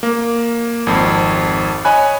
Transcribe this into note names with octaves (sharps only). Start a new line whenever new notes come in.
A#3
G#1 F2
C#5 D#5 G#5 B5 F#6